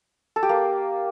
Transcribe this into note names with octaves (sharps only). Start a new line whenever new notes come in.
A4
G4
A#3